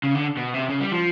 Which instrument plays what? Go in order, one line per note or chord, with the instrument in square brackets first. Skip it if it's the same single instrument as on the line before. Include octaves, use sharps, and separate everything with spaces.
[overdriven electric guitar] C#3
D3
B2
C3
C#3
G3
F3